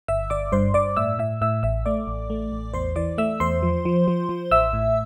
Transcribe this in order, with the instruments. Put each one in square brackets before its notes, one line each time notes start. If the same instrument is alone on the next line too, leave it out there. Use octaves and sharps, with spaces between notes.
[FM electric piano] G1 E5 E6
G1 D5 D6
G2 C5 C6
G2 D5 D6
A2 E5 E6
A2 E5 E6
A2 E5 E6
A1 E5 E6
A3 D5 D6
A1
A3
A1
E2 C5 C6
E3 D5 D6
A3 E5 E6
E2 C5 C6
F3
F3
F3
F3
A1 E5 E6
A2